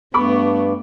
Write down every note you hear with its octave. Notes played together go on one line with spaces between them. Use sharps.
G2 A3 B3 B5 C#6 D6